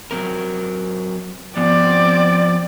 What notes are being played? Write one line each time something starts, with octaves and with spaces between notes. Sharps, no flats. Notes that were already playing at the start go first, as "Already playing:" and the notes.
F#3 C4 A#4
F3 B3 C4 D5